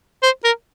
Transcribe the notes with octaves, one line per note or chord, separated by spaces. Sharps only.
C5
A#4